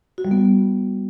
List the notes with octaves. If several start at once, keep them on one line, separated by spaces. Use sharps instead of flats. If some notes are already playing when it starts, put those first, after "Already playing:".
F#4
G3
B3